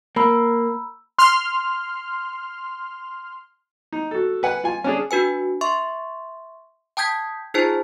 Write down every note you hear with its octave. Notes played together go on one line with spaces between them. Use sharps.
A#3 A#5 B5 E6
C6 F6
D#4
F#4 A4
B4 F#5 G#5
F4 G#5
C#4 D4 G#4
D4 F#4 B4 G#5
E5 C6 C#6
G5 A5 D#6 G6 G#6 B6
D#4 F4 G#4 C5 A5